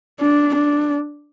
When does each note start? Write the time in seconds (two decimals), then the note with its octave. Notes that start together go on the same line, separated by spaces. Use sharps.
0.21 D4
0.56 D4